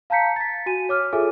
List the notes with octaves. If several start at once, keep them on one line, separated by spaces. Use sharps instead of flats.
F5 A5 A#5 G6 B6 C#7
A6 B6
F#4 G#5 D#7
C#5 D6 F6
F4 G#4 A4 E5 G#5 D6